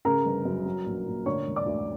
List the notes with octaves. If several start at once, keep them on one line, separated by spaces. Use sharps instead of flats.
C#3 A#4 A#5
G1
F#2
F#3
A#1
A#2
D3 C#5 C#6
E1
D5 D6
D2